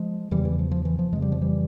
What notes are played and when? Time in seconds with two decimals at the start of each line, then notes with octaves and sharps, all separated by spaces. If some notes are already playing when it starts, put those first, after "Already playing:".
Already playing: F3 G#3
0.31 E2 C#3 E3 G3
0.45 E3
0.59 F3
0.71 F3
0.85 E3
0.99 F3
1.12 F2 C#3 G#3
1.22 G3
1.32 F3
1.41 E3 G3